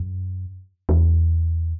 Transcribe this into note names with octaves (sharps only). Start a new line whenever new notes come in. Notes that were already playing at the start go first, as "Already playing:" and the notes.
Already playing: F#2
E2